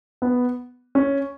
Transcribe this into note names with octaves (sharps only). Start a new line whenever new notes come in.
B3
C#4